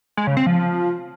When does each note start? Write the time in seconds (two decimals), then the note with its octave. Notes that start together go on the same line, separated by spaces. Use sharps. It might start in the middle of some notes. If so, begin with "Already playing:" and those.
0.17 G#3
0.27 C#3
0.37 C4
0.46 F3